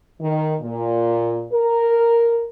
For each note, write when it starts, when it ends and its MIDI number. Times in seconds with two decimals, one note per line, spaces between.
0.21 0.55 51
0.61 1.46 46
1.53 2.45 70